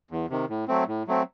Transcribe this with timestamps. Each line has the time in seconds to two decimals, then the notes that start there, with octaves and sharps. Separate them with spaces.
0.11 E2
0.30 C3 D#3
0.49 A2
0.68 F#3 A3 C4
0.88 A2
1.07 F#3 A3 C4